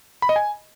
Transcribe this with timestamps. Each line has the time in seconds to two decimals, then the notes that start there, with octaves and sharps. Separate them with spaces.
0.22 B5
0.29 D#5
0.36 G#5